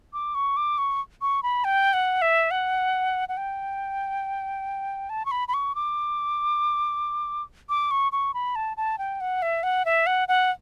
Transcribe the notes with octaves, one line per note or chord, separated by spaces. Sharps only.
D6
C#6
D6
C#6
C#6
B5
G5
F#5
E5
F#5
F#5
G5
A5
C#6
B5
B5
C#6
D6
D6
C#6
C#6
B5
A5
A5
G5
F#5
E5
F#5
E5
F#5
F#5